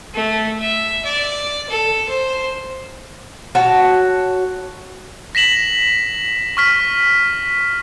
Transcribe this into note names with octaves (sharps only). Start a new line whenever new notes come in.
A3
E5
D5
A4
C5
F#4 C#5 A5
A#6 B6 E7 F#7
C#6 F6 B6